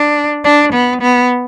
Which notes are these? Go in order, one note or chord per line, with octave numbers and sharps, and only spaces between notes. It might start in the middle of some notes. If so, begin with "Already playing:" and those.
Already playing: D4
D4
B3
B3